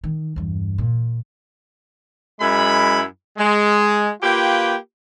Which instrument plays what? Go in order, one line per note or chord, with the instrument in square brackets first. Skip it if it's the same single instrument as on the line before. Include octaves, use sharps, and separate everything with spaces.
[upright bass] D#3
E2 G2
A#2
[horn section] F#2 G#3 E4 B5
G#3
A#3 F4 G4 B4 G5